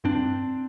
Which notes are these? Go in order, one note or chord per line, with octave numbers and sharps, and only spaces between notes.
G2 C4 D4